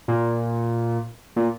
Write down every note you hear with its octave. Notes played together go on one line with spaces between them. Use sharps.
A#2
A#2